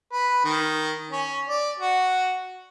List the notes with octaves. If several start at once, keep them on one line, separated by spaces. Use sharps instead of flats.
B4
D#3
C#4
D5
F#4